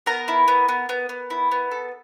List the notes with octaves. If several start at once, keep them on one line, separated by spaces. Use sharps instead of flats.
B3 A#4 A#5
E4
B3
B3
B3
B3
E4
B3
A4